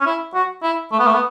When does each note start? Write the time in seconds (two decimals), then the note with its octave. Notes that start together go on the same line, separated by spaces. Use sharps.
0.01 C#4
0.06 E4
0.34 F#4
0.63 E4
0.92 A3
0.99 B3
1.07 A3
1.14 B3